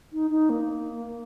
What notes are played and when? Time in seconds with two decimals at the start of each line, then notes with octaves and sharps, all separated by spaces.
0.13 D#4
0.31 D#4
0.50 A#3